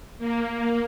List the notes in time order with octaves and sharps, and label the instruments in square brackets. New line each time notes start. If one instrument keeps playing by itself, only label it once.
[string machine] A#3